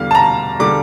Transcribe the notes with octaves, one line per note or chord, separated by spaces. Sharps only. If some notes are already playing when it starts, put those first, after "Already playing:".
Already playing: E2 D3 G3 F5
A5
A#5
D3 G3 D6